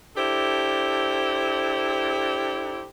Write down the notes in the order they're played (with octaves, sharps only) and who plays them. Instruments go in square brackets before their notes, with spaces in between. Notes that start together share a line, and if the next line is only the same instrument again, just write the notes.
[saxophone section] D4 E4 G4 A4 C5